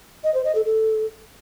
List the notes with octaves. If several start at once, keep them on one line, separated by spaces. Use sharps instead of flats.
D#5
C5
D#5
A4
A4